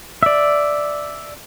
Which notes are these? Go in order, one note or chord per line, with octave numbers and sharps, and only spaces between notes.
D5 E5